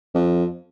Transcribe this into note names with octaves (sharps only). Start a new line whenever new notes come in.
F2